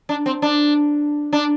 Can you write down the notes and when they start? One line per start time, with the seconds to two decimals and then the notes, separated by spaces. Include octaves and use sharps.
0.09 D4
0.26 C4
0.42 D4
1.33 D4